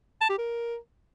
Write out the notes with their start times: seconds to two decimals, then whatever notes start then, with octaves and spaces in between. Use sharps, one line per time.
0.21 A5
0.30 G4
0.38 A#4